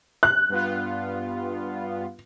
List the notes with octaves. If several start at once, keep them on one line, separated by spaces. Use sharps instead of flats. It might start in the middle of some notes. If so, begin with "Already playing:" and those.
F#6
G2 B3 F4